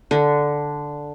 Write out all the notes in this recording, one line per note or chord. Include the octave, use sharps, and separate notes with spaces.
D3